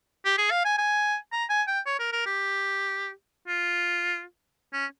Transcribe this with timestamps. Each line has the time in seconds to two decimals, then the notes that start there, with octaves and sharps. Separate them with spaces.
0.25 G4
0.38 G#4
0.51 F5
0.65 G#5
0.78 G#5
1.32 A#5
1.50 G#5
1.68 G5
1.86 C#5
1.99 A#4
2.12 A#4
2.26 G4
3.48 F4
4.73 C#4